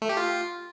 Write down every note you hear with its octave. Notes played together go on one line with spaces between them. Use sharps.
A3
G4
F4